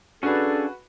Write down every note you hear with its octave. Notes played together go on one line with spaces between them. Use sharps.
C#4 D4 F#4 G#4 A4 B4